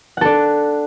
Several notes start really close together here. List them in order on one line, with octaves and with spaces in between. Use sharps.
F#5 A4 D4